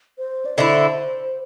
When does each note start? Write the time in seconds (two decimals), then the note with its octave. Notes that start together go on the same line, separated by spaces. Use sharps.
0.18 C5
0.45 D5
0.57 D3 A3 E4 C5